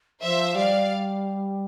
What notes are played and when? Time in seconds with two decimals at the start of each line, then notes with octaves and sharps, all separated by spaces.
0.22 F3 C5 E5
0.55 G3 D5 F5